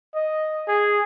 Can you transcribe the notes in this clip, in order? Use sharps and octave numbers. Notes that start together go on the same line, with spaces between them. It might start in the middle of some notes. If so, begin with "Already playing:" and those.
D#5
G#4